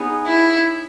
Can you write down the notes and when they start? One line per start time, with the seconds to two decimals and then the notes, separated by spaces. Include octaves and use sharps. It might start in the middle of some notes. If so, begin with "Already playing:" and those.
Already playing: B3 D#4 G#4 C#5
0.27 E4